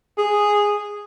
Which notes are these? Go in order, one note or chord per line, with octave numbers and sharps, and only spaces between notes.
G#4